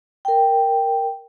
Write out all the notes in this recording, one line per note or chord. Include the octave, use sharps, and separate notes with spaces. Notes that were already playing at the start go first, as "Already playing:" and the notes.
A#4 G5